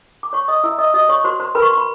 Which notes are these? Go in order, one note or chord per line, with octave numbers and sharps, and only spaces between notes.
D6
C#5 C#6
D#5 D#6
E4 E5 E6
D#5 D#6
F#4 D#5 D#6
C#5 C#6
F#4 C5 C6
C5 C6
A#4 B4 B5
C#6
C6
B5